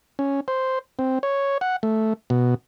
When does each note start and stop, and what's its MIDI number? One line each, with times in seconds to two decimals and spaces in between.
0.19 0.40 61
0.48 0.79 72
0.99 1.19 60
1.23 1.58 73
1.61 1.76 78
1.83 2.13 57
2.30 2.55 47